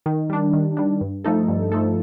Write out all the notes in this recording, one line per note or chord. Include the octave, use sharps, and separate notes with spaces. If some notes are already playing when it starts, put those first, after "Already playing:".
D#3
G3 D4
D#3
G3 D4
G2
F3 A3 D#4 A4
G2
F3 A3 D#4 A4